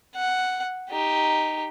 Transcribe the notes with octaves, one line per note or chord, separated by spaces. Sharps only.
F#5
D#4 G4